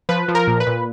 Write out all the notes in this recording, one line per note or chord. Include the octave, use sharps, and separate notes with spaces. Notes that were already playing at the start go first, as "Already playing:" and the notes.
F3 B4
F3
A#4
A#2
B4
A#2